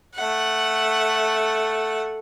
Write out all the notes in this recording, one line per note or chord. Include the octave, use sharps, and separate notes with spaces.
A3 F#5